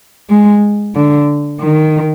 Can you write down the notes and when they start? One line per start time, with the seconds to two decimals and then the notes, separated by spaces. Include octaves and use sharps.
0.29 G#3
0.95 D3
1.61 D#3